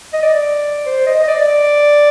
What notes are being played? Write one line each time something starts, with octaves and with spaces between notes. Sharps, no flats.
D#5
D5
C5
D#5
D#5
D5